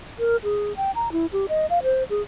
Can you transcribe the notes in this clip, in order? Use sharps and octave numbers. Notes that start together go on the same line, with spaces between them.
A#4
G#4
G5
A#5
E4
G4
D#5
F5
C5
G#4